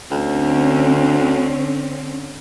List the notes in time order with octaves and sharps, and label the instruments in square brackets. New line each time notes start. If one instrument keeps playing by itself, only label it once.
[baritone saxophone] D2 [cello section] D3 C4 C#4